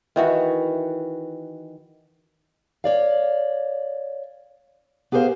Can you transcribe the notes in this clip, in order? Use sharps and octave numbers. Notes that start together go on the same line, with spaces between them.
D#3 E3 F#4
C#5 D5 F5
B3 G4 G#4 A#4 C5 F5